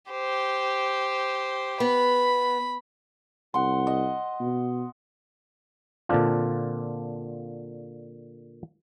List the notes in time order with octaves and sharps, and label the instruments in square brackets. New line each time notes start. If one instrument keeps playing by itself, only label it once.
[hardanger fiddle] G4 C5
[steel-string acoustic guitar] B3 [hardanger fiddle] B5
[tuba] C2 [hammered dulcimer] F#5 C6
[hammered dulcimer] D#5
[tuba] B2
[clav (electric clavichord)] A#2 D3 C4 D4 F4